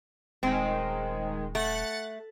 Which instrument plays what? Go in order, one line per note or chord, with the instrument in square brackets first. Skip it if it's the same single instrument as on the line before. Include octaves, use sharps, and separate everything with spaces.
[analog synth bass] D#1 [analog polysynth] D#3 G#3 [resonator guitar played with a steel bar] C4
[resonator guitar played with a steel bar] A3 [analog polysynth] F#5 F#6 A6